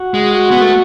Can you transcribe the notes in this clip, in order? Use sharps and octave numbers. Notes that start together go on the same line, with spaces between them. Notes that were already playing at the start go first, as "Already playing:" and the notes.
Already playing: F#4
G#3
F#4
B3
A3